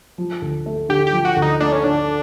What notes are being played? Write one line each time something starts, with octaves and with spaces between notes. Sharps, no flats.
F3
D2
A3
D3 G4
G4
F3
F#4
D2
D#4
A3 D4
C#4
D3 D4